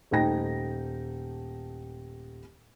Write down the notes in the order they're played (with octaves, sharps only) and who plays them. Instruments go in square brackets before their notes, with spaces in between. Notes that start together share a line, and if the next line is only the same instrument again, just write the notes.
[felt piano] D#1 A3 D#4 G5 A#6